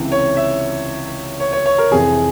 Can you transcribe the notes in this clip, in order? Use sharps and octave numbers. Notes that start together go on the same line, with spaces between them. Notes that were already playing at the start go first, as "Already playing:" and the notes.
Already playing: C#2 C3 E3
C#5
E5
C#5
C#5
C#5
A#4
F1 F2 C3 E3 G#4